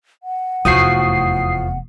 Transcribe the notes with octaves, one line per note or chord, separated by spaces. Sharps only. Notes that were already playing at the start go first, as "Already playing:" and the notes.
F#5
F1 E2 A2 F3 F#4 D#6 C7